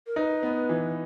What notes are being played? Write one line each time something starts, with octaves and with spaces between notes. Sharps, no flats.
A#4
D#4 B4
B3
E3